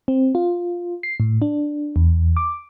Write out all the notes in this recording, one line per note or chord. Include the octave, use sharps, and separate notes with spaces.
C4
F4
C7
A2
D4
E2
D6